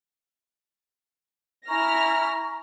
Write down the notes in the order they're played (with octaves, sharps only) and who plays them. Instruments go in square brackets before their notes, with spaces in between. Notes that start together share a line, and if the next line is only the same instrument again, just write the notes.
[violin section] E4 F6 A#6 [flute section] G#5 A#5 C#6